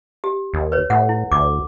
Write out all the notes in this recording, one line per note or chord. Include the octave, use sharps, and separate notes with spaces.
G4
D#2
B4 C#5
A2 F#5
E4
D2 D6